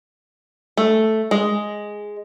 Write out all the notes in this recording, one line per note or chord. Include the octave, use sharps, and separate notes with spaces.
A3
G#3